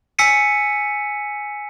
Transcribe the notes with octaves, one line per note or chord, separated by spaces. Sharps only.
G#5 E6 B6 C#7 D#7